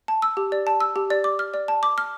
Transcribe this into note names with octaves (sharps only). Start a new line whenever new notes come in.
A5
E6
G4
D5
A5
E6
G4
D5
D6
F6
D5
A5
D6
F6